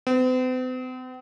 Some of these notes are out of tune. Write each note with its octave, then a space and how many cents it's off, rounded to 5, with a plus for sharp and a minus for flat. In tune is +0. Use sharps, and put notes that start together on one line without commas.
C4 -45